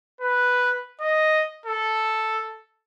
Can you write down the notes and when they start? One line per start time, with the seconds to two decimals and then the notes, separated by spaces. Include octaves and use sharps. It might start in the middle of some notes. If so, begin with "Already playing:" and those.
0.21 B4
1.01 D#5
1.66 A4